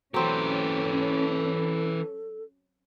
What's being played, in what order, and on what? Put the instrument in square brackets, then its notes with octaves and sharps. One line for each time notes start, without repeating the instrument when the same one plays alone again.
[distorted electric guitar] E3 G4 [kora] F#3 C4 [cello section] C#4 [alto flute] A4